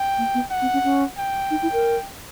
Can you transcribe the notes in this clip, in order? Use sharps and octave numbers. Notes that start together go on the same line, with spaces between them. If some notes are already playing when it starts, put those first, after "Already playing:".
Already playing: G5
A#3
B3
F#5
C4
C#4
C#4
G5
D#4
E4
A#4